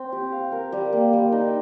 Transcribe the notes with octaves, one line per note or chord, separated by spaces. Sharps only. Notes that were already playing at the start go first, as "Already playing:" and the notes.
Already playing: C4
G4
F5
A#4
G3
A#3
G3
D#4